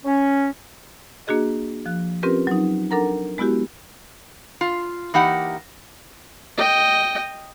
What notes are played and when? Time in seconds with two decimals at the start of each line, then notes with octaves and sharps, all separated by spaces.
0.04 C#4
1.27 A#3 D4 F#4 G#4 D#5
1.86 F3 F#6
2.23 C4 C#4 F4 G4 A#4 B4
2.47 F#3 D#4
2.91 D4 A4 A#4 F#5 A#5
3.38 G#3 B3 E4 F#4 G4
4.61 F4
5.14 E3 A#3 D#4 G4 F#5
6.58 D#5 G5